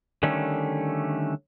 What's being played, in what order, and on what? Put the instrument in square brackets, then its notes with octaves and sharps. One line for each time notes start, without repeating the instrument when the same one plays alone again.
[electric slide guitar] D3 D#3 G3 A3 C#4